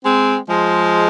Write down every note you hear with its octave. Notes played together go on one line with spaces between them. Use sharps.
G#3 C4
F3 G#3